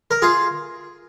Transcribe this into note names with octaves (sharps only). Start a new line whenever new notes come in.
A#4
F4 G#4